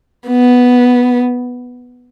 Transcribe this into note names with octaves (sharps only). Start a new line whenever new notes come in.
B3